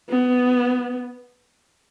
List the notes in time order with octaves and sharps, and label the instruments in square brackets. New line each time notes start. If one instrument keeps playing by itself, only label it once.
[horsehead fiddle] B3